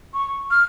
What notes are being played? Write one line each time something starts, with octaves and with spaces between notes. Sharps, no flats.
C#6
F6